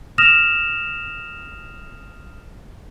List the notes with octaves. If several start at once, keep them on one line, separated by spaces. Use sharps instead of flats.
D#6 F6 A#6 E7 F7